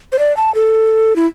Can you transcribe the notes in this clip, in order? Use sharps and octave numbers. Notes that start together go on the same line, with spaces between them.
C5
D5
A5
A4
E4